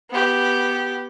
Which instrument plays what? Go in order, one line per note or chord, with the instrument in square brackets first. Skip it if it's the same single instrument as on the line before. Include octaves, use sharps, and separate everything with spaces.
[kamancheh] B3 G4